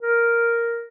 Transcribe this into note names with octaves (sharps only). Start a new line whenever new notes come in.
A#4